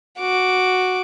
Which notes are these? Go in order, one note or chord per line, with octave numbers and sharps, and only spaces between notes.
F#4 D6